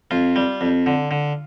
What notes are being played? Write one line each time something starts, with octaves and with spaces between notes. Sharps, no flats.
F2 F4
G3
F2
D3
D3